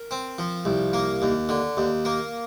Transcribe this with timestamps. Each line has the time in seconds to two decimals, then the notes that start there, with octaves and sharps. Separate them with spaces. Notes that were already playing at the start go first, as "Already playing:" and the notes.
Already playing: A#4
0.11 C4
0.39 F3
0.65 C2
0.93 A#3
1.22 D#2
1.49 D3
1.77 D#2
2.05 A#3